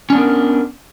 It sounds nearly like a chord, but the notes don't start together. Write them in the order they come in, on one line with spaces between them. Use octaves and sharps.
C#4 D4 B3 A#4